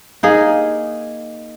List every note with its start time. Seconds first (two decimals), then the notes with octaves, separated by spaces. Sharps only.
0.23 A#3 D#4 G#4